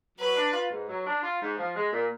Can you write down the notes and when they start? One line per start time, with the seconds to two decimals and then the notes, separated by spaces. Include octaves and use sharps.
0.19 F#3 B4
0.36 D4
0.53 F4
0.71 G#2
0.88 F#3
1.06 D4
1.23 F4
1.41 G#2
1.58 F3
1.75 G#3
1.93 A#2